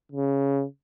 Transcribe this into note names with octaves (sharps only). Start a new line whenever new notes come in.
C#3